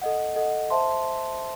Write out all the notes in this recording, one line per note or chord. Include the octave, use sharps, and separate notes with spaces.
A4 D#5 F#5
A4 D#5 F#5
C5 E5 A5 C6